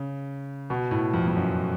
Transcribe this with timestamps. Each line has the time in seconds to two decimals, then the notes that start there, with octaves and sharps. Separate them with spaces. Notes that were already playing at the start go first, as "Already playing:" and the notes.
Already playing: C#3
0.70 B2
0.91 A2
1.13 F2
1.27 F2
1.37 F#2